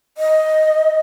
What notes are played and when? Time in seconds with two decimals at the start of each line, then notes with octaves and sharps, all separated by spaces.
0.18 D#5